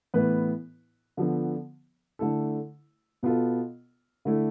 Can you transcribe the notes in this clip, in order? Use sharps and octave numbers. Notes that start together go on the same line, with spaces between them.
A2 E3 B3 E4 B4
D3 F3 B3
D3 A3 E4 A4
B2 B3 F4 A4
D3 A3 E4